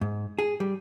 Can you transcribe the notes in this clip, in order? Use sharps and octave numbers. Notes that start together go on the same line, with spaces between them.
G#2
G#4
G3